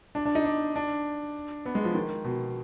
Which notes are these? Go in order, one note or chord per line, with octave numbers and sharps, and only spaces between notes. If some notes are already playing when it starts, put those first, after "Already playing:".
D4
D4
D#4
D4
D4
B3
G#3
F3
D#3
B2